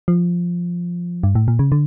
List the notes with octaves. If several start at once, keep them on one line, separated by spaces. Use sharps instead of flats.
F3
G2
A2
A#2
C#3
D3